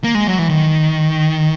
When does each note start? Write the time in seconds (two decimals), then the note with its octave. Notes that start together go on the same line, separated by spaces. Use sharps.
0.04 A#3
0.15 G#3
0.27 F#3
0.38 E3
0.50 D#3